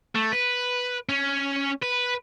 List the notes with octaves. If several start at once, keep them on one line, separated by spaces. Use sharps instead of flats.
A3
B4
C#4
B4